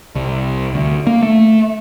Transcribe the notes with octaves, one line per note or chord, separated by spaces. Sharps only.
C2
D2
A#3
A3